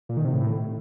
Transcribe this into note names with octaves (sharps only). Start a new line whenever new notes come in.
A#2
D#3
C3
A2